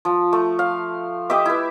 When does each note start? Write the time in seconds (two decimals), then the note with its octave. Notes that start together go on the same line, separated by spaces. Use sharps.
0.05 F3
0.33 A3
0.59 F5
1.30 G4 D#5 E5 D6
1.45 E4 B4